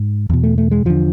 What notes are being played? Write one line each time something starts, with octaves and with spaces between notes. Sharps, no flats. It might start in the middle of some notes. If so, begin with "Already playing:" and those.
Already playing: G#2
E2 B2
A3
A3
G#3
E2 D3 F3